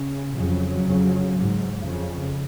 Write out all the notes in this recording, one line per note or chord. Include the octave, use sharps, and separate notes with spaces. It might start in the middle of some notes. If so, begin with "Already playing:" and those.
Already playing: C#3
F2 C#3 F#3
F2 C#3
G#2
F2 C#3